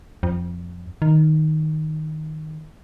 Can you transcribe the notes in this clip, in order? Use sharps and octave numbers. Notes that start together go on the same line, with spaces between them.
F2
D#3